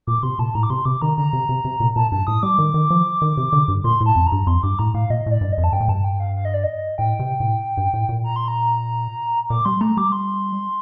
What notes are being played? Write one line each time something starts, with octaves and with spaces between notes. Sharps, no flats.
A#2 D6
C3 C6
A#2 A5
A2 A#5
D6
C3 C6
C3 D6
D#3 A#5
D3 A#5
C3
C3
C3
A#2
A#2 A5
G2 A5
A2 D#6
G3 D6
D#3
D#3
F3
D#3
C3
D3
G2
A#2 C6
A2
A5
F2
A#5
G2
F2 C6
G2 D6
A2 A#5
A2 F5
A#2 D#5
A2 D5
G2
D#5
F2
A5
G2 G5
A2
G2 A5
G5
F5
F5
D#5
D5
D#5
A2 G5
C3
A2
G2
A2
A#2
A#5
C6
A#5
A#2 D6
G3 C6
A3 A#5
G3 D6
C6